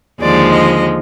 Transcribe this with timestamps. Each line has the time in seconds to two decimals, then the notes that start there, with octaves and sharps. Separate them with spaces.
0.22 D#2 D3 F3 G#3 D5
0.52 D#5